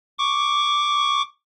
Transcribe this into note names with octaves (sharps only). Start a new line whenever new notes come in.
C#6 D6